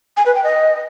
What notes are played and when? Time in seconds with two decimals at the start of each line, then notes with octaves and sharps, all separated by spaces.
0.17 G#5
0.26 B4
0.35 G5
0.44 D#5